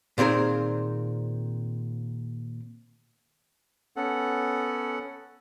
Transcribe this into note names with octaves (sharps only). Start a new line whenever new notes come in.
A#2 D#3 C4 G#4 A#4
B3 C#4 A4 F#5